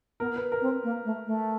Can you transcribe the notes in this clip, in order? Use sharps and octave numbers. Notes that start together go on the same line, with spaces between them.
B3 A#4
B4
A#4
C4
A#3
A3
A3